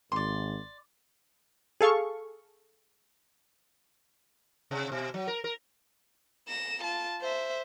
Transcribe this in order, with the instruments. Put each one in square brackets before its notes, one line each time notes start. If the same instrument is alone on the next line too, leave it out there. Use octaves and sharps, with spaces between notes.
[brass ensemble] G#1 [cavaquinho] D5 C6
[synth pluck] G#4 A4 F5 C#6
[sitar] C3
B2
F#3
A#4
A#4
[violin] A#6 E7
F4 A5
C5 E5